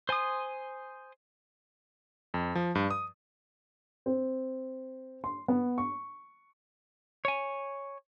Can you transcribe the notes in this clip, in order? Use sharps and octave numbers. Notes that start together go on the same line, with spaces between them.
C5 G#5 C6 D#6
F2
F3
G2
D#6
C4
C6
B3
C#6
C#5 G#5